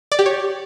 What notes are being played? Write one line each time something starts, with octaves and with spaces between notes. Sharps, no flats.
D5
G4
C#5